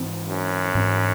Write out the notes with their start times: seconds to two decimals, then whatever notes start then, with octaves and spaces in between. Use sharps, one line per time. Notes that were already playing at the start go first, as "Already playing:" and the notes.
Already playing: G#2 E3 C4
0.28 F#2
0.74 G#2 E3 C4